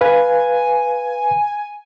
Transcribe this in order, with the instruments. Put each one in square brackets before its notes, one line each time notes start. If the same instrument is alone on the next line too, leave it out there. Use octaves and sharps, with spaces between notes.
[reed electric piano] B4 F5 [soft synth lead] G#5